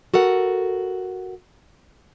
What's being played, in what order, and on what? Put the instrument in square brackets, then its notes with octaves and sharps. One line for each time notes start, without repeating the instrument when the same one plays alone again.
[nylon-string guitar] F#4 A4 A#4 F#5